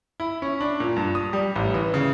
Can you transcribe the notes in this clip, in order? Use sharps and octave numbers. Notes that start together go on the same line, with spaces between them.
E4
C#4
D4
A#2
G2
D#6
G3
A1
E3
C#3